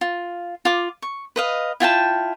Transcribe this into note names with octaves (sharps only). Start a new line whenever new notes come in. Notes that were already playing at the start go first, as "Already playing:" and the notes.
F4
F4 D6
C#6
B4 D#5 F5
E4 F4 G5 A5